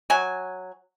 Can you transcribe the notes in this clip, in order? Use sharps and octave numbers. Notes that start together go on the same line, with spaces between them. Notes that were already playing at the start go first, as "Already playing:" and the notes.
F#3 G#5